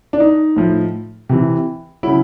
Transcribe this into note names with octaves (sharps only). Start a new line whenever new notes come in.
D4
D#4
A2 F3
C3 E3
C#3 F#3 E4